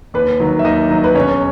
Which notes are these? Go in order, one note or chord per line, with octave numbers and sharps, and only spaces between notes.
D#2 B4
D#3 F#3
E5
D#2 D#4 D#5
D#3 F#3
B4
E1 C#4 C#5